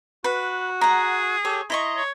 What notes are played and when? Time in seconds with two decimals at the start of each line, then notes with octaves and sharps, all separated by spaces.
0.24 F#4 B4
0.81 G#4 F#5 A#5
1.45 G4 A4 C#5
1.70 E4 D#5 A#5 C6 C#6
1.97 C#5